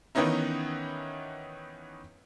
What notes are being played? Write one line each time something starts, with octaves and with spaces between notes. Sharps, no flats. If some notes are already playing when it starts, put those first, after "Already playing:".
D#3 E3 B3 C#4 D#4 E4